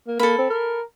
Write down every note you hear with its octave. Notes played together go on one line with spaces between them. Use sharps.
A#3
A#3 A4 B5
C4
A#4